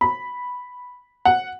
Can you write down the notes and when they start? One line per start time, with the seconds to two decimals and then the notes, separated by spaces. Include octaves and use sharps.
0.01 B5
1.25 F#5